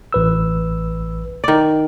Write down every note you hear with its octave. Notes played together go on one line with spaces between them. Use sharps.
A1 B4 E6
D#3 D5